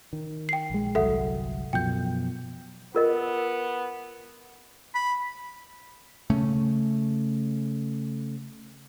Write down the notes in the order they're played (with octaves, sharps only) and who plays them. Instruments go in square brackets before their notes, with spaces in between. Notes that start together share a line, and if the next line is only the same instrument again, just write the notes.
[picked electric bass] D#3
[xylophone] G5 C7
[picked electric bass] A#1 G#3
[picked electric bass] G1 C2 F#3 [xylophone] A4 E5 F#5
[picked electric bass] F#2 B2 F3 [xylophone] G5 G6
[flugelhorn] B3 [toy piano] F4 A#4 D#5
[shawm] B5
[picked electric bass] C#3 A3 C#4